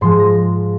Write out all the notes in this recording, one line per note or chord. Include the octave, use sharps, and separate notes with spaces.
G#2 F3 G#3 C6
A#5